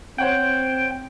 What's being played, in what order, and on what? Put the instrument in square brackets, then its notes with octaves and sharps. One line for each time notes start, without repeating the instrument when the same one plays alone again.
[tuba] C4 [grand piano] C5 C#5 F#5 [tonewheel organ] G5